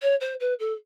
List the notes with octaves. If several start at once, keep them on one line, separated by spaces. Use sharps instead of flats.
C#5
C5
B4
A4